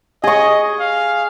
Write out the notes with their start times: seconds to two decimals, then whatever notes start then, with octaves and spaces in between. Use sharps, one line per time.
0.24 G#4 D#5 C#6
0.80 F5